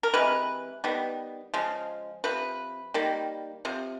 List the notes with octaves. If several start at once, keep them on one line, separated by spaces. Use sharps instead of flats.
A#4
C3 E3 G#3 B4
D#3 G3 B3
C#3 F3 G#3
C3 F3 B4
D#3 G3 A#3
C3 F3